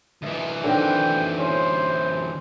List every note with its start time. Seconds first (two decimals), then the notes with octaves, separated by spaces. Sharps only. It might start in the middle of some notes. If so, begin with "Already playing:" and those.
0.22 D2 E3 D#5 E5
0.64 D3 D#3 C4 G5
1.38 C#4 E4 C5